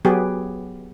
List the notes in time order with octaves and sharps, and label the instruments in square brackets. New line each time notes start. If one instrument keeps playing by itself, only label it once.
[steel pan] F#3 B3 G4 G#4